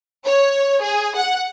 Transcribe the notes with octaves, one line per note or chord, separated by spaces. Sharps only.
C#5
G#4
F#5